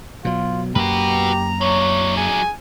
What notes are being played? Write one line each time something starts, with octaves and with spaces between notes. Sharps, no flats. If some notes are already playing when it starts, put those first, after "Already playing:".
B2 F#3 F4
F#2 A#3 F#4 G4 B4 A#5
F#3 D4 C#5
G#4 G#5